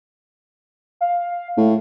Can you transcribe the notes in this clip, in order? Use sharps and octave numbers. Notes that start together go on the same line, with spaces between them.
F5
A2